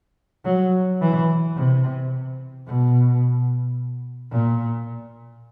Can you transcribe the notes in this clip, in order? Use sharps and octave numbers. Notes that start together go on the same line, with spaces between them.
F#3
E3
C3
B2
A#2